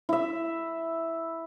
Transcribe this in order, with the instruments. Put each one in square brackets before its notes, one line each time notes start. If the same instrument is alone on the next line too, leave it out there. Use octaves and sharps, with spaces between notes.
[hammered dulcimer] E4 E5